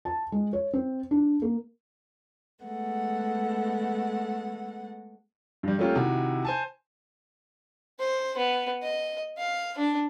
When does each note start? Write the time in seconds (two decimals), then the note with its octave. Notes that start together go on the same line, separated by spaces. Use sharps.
0.05 A5
0.32 G#3
0.53 C#5
0.73 C4
1.11 D4
1.42 A#3
2.64 G#3 A3 B3 F#5
5.63 G2 G3
5.78 G3 A3 A#3 C#4 F4 G4
5.96 C3 D#3 E4 F#4
6.45 C5 G#5 A5
7.99 C5
8.37 B3
8.83 D#5
9.37 F5
9.78 D4